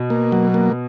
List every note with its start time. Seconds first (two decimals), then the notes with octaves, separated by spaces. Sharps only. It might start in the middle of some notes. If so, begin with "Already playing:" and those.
Already playing: B2
0.10 A#3
0.32 F#3
0.54 A#3